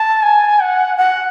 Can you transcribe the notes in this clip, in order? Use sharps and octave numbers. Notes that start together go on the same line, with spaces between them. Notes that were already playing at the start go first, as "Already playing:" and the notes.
Already playing: A5
G#5
F#5
F#5